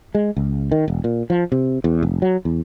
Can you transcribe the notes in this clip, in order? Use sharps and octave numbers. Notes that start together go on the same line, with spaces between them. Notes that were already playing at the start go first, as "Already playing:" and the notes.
G#3
C#2
D#3
E1
A#2
F3
C3
E2
F1
F#3
E2